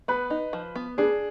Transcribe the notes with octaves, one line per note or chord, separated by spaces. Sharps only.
B3 B4
D#4
F3
B3
D4 G#4